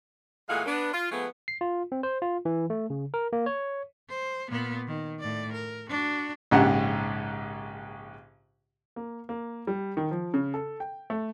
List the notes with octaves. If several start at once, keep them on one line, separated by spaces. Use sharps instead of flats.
A#2 E3 G#3 A3 F5 F#5
B3 D4
F4
F3 G#3 A3 B3
C7
F4
C4
C5
F4
E3
A3
C#3
A#4
A#3
C#5
C5
A#2 B3
D#3
A2 D5
A#4
D4 F#4
A#1 G#2 C#3 G4 F#5
A#3
A#3
G3
D#3
F3
C#3
A4
G5
A3